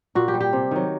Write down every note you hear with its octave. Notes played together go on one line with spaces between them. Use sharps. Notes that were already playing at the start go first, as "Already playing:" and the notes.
A#2 F#4
G4
G3
G4
C3
D#3 F#3